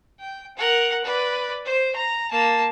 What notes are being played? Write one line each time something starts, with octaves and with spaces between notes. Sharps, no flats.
G5
A#4 F#5
B4 D5
C5
A#5
A#3 A5